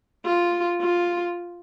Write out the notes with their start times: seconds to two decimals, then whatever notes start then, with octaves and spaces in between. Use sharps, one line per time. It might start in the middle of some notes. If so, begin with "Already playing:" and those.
0.25 F4
0.81 F4